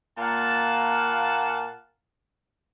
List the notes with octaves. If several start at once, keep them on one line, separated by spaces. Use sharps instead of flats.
A#2 A#3 F5 F#5 A5